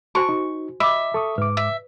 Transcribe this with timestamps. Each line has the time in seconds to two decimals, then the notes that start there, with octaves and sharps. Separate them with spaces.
0.15 F#4 C5 G#5 A5 C#6
0.29 D#4
0.80 D#5 E5 B5 D6
1.14 A4 C#6 D#6
1.38 G#2 B4 D6
1.57 E5